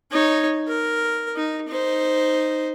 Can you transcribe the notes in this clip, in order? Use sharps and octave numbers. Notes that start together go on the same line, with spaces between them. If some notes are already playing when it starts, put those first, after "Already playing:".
D#4 C#5
A#4
D#4
D#4 C5